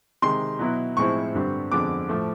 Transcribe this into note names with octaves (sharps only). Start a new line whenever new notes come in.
C3 D#3 G#3 C6
B2 F#3 B3 E4
A2 F3 G#3 C4 E4 C#6
G2 D3 G3 C4
F2 D3 F3 G#3 B3 D6
A2 F3 A3